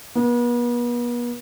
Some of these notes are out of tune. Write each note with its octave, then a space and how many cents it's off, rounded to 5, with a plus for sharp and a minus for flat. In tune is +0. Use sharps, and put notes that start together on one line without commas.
B3 -40